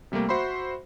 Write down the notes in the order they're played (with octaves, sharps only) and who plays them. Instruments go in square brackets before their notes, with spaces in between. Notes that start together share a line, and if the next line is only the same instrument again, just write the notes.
[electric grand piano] C3 G3 A3 A#3
F#4 C5 E5 B5 C6